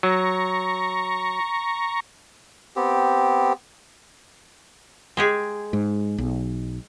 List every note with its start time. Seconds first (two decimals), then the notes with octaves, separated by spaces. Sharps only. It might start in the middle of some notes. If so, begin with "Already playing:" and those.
0.03 F#3 A#5 C#6
2.76 B3 C4 G4
5.17 G#3 G4 G#4
5.73 G#2
6.18 B1